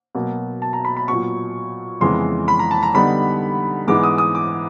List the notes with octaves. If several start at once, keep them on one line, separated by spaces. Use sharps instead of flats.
B2 F#3 A#3
A5
A#5
B5
B5
A#2 F#3 B3 C#6
F2 C#3 E3 G#3 B3 C6
B5
A#5
A5
A#5
D3 G3 B3 D#4 B5
G#2 E3 G#3 B3 D6
D#6
D#6
D6